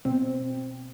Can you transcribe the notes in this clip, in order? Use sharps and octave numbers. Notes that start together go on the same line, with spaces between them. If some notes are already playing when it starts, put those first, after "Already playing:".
B2 C4